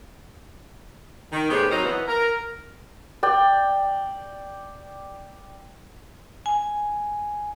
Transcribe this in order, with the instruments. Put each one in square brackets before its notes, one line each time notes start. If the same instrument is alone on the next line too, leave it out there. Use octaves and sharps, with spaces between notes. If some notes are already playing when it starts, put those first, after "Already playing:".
[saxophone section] D#3
A2 B3 D#4 G4 G#4 C5
F#3 C4 D#4 A#4 C5 C#5
E3 B3
A#4
[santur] D5 G5
[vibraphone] G#5